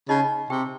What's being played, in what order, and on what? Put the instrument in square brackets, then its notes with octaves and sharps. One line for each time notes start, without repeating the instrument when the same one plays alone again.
[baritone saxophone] C#3 [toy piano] D#4 D#5
[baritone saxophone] C3 [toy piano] G4 G5